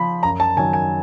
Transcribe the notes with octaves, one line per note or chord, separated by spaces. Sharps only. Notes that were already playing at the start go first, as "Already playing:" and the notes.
Already playing: F3 B5
F#2 A#5
A5
D#3 F#3 G#5
G#5